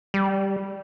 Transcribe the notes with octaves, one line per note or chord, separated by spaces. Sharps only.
G3